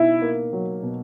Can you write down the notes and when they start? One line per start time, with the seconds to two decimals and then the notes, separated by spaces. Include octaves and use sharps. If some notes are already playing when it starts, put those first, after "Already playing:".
Already playing: B2 D#4 E4
0.22 A#3
0.53 F#3
0.83 B2